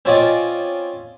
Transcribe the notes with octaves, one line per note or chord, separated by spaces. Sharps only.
C4 C#4 F4 D5 D#5